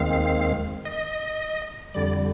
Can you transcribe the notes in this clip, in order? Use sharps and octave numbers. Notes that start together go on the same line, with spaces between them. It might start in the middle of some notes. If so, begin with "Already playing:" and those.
Already playing: D#2 D#3 G#3 C4 F5
D#5
F2 D3 G3 D5